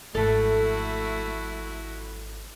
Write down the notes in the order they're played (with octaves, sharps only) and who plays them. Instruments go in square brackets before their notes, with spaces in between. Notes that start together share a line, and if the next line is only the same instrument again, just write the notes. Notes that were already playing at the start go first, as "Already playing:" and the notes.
[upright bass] G#1 F3 [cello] A3 [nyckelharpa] E4 F#4 [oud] A4